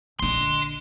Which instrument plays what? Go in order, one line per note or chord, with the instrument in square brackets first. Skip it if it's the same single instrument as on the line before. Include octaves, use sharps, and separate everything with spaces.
[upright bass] A#1 D3 [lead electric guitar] D#5 C6